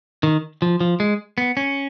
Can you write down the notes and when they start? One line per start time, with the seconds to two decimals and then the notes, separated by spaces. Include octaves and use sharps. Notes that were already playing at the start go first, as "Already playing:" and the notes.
0.23 D#3
0.62 F3
0.81 F3
1.00 G#3
1.38 B3
1.57 C#4